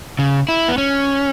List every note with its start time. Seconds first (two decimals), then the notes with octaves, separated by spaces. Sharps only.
0.19 C#3
0.49 E4
0.68 B3
0.78 C#4